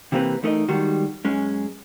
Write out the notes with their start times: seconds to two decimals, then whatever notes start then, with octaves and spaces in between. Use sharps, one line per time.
0.12 C3 E3 A#3 C4 G4 B4
0.43 E2 A3 D#4 A#4 D#5
0.68 D#3 G3 G#3 F#4
1.25 F#2 G#3 C#4